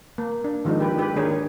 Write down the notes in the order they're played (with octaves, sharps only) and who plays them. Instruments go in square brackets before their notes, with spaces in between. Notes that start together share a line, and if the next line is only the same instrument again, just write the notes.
[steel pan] A#3
D4
D#3 F3 G#3 A#3 D4 D#4
G4 B4
G#3 G4 B4
D#3 A#3 D4 G#4 A#4 C#5